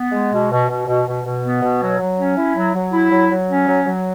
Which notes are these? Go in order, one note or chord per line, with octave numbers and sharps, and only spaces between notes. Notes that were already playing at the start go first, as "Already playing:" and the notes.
Already playing: B3
G#3
B2
B2
B2
B2
B2
B2
B3
B2
F#3
F#3
C#4
E4
F#3
F#3
E4
F#3
F#3
C#4
F#3
F#3